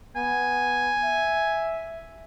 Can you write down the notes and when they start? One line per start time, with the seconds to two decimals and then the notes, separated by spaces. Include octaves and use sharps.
0.16 B3 G#5
1.04 E5